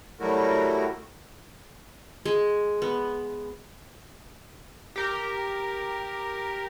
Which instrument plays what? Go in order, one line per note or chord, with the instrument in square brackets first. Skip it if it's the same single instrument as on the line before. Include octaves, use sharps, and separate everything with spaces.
[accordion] F#3 G3 A3 E4 F#4 A#4
[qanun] G#3
B3
[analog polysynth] G4 A#4